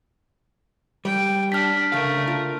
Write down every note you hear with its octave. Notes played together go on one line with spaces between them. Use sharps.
G3 G5
D4 F6 B6
C#3 A3 A#4 F5
F4